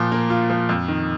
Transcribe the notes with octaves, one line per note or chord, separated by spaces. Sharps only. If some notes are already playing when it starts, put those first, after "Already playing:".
Already playing: A#2 F3
A#3
F4
F3
F2
D#3